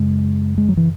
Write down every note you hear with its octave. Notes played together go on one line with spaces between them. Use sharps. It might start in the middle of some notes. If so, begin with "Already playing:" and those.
Already playing: F#2 C#3 G#3
G#3
F#3
E3